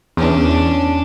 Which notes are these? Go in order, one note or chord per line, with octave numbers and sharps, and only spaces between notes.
E2 C#4 D4